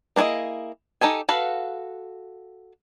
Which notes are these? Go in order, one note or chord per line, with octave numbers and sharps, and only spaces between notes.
A#3 D4 E4 G#4 D#5
D#4 G4 A4 G#5
F#4 A4 B4 F5